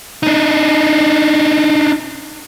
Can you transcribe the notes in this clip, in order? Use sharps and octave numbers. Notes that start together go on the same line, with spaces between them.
D4 D#4